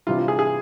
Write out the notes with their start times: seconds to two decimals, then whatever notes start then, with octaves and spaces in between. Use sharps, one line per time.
0.07 C3 E3 G3 F4
0.17 F4
0.28 G#4
0.39 G#4